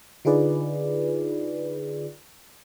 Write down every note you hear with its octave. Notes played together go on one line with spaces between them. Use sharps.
D3 D#4 F4 G#4 B4 D5